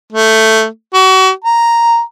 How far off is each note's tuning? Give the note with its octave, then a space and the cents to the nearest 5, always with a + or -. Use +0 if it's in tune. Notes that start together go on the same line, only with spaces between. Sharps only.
A3 +5
F#4 +35
A#5 +0